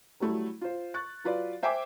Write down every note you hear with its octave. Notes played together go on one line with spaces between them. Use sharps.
F#3 G3 A3 E4
F4 C5
C#6 F#6 A6
F#3 F4 B4 D5
C5 E5 G5 G#5 D6